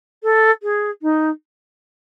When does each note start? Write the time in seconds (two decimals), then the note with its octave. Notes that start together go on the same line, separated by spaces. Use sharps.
0.23 A4
0.63 G#4
1.02 D#4